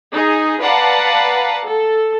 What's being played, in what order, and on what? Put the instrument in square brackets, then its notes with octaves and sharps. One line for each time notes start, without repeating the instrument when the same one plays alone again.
[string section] D#4 G#4
B4 D5 F5 F#5 A5 A#5
A4